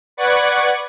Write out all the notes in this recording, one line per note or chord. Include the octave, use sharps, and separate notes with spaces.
B4 D5 F#5 C#6 G#6